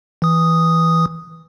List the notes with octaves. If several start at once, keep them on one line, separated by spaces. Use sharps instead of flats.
E3 D#6